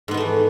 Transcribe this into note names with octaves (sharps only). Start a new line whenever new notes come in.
G#2 D#3 E3 A3 B3